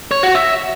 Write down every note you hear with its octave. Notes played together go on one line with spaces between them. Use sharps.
C#5
F#4
E5